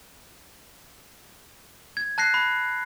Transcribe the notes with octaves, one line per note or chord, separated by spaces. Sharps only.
G#6
A5 F#6 A#6 C7
B5